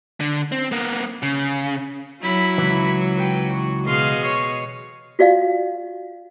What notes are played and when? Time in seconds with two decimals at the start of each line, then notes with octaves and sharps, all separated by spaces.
0.20 D3
0.52 C4
0.72 A#3 B3
1.23 C#3
2.22 F#3 E4 B5
2.58 C#2 E3
3.15 B4 G5
3.51 F#4
3.87 B2 G#4 D#5 F5 C6
4.24 C#5
5.19 F4 F#4 D5 F5